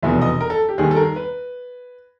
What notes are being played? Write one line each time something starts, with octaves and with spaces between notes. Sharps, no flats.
F1 E2 B2 E5
D#5
A#4
A4
G4
D#2 D#3 G3 G#4
A4
A#4
B4